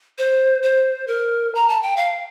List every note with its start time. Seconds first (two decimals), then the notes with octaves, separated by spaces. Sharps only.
0.18 C5
0.63 C5
1.07 A#4
1.55 A#5
1.69 A5
1.83 G5
1.97 F5